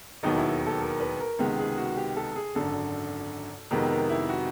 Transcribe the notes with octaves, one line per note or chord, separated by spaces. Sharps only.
E1 D#2 D#3 F#3 B3 D#4
E4
A4
A#4
B4
A#4
C#2 C3 D#3 G#3 B3
G#4
F#4
G4
A4
G#4
G#1 F#2 D3 A4
F2 C3 D#3 G#3 B3 A#4
A#4
E4
F#4